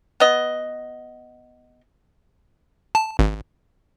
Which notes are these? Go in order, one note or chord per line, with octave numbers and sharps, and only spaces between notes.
B3 D#5
A5
G#1